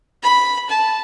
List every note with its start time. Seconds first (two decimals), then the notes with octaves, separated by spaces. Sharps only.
0.23 B5
0.70 A5